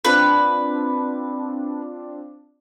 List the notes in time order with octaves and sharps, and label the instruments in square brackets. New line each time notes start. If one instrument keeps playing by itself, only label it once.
[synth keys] C4 D4 F4 [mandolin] B4